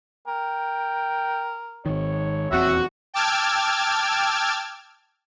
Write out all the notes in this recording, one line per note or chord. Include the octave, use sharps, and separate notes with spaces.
A#4 G5
G#1 D#3 C#5
D#1 E2 C4 F#4 E5
G5 A5 D6 E6 F6 G#6